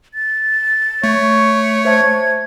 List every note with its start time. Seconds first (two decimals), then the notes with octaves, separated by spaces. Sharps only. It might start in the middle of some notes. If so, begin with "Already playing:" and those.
0.14 A6
1.04 A3 C#5
1.85 C5 E5 A5 G#6